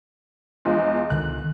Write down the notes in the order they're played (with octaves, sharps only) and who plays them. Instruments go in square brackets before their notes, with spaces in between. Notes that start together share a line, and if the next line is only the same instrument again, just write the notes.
[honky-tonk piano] E2 F3 G#3
[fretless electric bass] C#2 D3 D#3 [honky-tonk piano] F#6